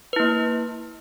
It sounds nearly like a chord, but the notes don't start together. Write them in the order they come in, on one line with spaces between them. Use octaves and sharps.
B4 E4 A#3